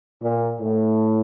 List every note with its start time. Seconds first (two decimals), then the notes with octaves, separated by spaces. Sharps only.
0.23 A#2
0.60 A2